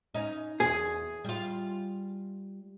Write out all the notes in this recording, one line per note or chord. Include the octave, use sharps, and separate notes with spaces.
C#4 D#4
E2 G#4
G3 F4